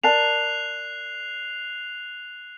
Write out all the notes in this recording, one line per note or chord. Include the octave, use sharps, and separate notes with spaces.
A#4 D5 A5 F#6 C7 F7